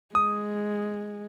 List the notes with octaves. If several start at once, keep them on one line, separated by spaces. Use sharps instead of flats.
G#3 D#6